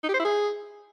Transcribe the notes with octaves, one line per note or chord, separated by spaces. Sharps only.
D#4
G4
C5
E4
G#4